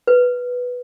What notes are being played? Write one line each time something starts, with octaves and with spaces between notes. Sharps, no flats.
B4